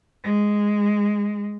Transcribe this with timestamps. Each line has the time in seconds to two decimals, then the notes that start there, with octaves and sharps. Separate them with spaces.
0.22 G#3